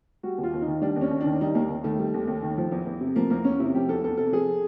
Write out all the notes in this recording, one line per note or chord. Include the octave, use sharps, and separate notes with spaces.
G3 F#4
D#2
F4
D#2
D#4
D#3
G3 D4
D#2
C#4
D#2
D4
D#3
G3 D#4
D#2 A#3
D#2
D#3 A3
G3
D#2
D#2
D#3
F3
E2
E2
C3
F3 A#3
E2 A#3
E2 C#4
C3 E4
F3 G4
E2 A4
E2 A4
C3 A4
F3 G#4